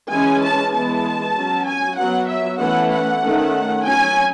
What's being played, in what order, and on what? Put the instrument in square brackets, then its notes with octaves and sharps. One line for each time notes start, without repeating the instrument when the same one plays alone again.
[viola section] E3 G#3 C#4 G#5
A5
E3 G#3 B3 A5
F#3 C#4
G#5
F#3 B3 F#5
E5
E3 A3 C#4 F#5
F#5
D#3 A3 C#4
F#3 C#4 G#5